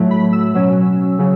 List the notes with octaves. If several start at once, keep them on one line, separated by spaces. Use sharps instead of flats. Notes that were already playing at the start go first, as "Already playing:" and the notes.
Already playing: A2 F#3 A3
B5
E6
B2 F#3 C#4
C#3 F#3